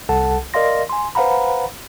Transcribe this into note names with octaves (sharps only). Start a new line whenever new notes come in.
C2 A4 F#5 A5
A#4 D5 D#5 F5 C6 A#6
G#5 C6
B4 C5 F5 F#5 A#5 B5